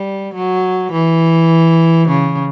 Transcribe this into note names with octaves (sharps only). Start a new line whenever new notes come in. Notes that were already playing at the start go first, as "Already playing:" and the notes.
Already playing: G3
F#3
E3
C#3